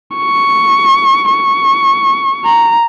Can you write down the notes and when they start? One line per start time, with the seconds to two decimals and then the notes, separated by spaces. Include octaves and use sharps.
0.16 C#6
1.30 C#6
2.45 A#5